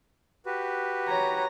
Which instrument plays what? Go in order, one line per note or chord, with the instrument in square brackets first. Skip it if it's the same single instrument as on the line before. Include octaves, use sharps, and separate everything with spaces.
[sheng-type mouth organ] F#4 G4 B4
[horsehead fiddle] C#5 A#5